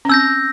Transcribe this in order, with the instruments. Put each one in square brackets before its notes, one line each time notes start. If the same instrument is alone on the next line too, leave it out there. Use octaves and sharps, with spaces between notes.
[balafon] C#4
[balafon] C4 [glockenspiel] E6 G6 A#6